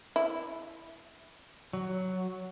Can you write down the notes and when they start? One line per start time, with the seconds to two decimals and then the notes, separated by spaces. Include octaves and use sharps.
0.16 E4
1.73 F#3